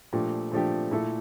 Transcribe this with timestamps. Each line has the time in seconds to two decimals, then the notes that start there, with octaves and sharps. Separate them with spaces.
0.12 A#2 F3 A3 D4 G4
0.51 A#2 F3 A3 D4 G4
0.91 A#2 A3 E4 A4